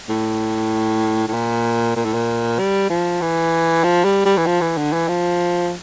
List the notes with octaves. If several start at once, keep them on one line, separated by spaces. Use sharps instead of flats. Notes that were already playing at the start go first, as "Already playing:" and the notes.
A2
A2
A#2
A#2
A2
A#2
G3
F3
E3
F3
G3
G3
E3
F3
E3
D3
E3
F3